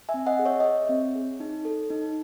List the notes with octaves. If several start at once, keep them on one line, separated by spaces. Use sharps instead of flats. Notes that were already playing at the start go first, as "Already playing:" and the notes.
E5 G#5
C4
D#5 F#5
G#4
C#5 E5
D#5
G#4 C#5
C4
G#4
D#4
A4
D#4